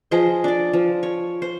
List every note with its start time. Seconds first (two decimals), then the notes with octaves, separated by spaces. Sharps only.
0.11 F3 G#4 C5 D#5
0.44 D4 D5
0.73 F3
1.03 C#5
1.42 C5